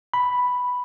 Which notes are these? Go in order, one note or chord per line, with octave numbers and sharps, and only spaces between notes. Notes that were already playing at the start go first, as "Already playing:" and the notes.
B5